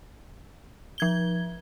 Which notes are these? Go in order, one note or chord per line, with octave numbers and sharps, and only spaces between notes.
F3 G#6 G7